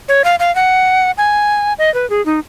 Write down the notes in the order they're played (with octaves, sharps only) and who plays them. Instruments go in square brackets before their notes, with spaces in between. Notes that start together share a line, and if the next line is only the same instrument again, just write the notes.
[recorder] C#5
F5
F5
F#5
G#5
D#5
B4
G#4
D#4